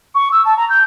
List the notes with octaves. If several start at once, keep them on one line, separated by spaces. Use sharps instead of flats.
C#6
E6
A5
A#5
G6